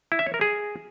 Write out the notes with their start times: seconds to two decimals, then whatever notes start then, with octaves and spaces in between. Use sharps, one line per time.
0.12 E4
0.19 E5
0.26 C#5
0.34 A#4
0.41 G#4